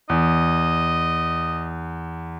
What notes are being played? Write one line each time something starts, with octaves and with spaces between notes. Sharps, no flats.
E2 D#5